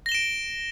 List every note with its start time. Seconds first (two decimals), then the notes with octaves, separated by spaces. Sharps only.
0.06 A#6
0.09 G7
0.12 E7
0.15 D7